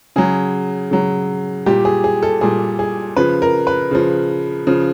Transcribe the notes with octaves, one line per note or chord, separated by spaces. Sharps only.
C#3 F#3 G#4
C#3 F#3
A#2 G3 G4
G#4
G#4
A4
A#2 G3 G#4
G#4
C#3 F3 B4
A#4
B4
C#3 F3
C#3 F3